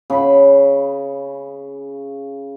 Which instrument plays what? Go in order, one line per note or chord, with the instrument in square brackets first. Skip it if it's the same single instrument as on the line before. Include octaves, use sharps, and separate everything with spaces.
[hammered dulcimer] C#3 B5